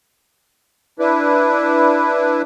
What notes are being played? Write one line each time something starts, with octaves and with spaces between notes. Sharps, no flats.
D4 E4 B4